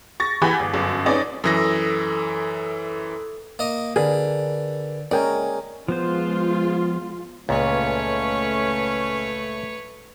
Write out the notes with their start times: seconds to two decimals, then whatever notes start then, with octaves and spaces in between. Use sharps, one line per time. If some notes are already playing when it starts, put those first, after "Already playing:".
0.20 C#6 A6 A#6
0.42 E3 G4 F#5 G#5 B5
0.60 G1
0.74 G1 F#2
1.06 C#4 D#4 B4 D5 D#5
1.44 F#2 E3 A4 D#6 E6 A#6
3.59 A#3 D#5
3.96 D3 G#4 A#4 B4
5.11 G#3 C#4 A#4 C#5 D5 G5 G#5
5.88 F3 G#3 B3 F4 C5
7.49 C#2 A#2 A3 C#4 B4 C#5